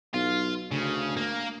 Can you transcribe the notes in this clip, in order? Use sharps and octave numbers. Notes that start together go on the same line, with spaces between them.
B1 F4
D2 C#3
A#3